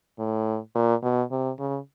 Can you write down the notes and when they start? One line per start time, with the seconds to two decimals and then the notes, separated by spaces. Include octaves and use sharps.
0.19 A2
0.75 A#2
1.03 B2
1.31 C3
1.59 C#3